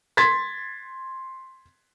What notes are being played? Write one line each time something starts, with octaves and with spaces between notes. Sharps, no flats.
C6 G#6 A6 B6